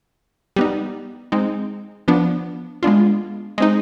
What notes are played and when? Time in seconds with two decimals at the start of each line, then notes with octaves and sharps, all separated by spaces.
0.56 G3 B3 D#4
1.32 G#3 C4 D#4
2.08 F3 B3 D4
2.83 G#3 B3 D4 F4
3.58 G#3 C4 D#4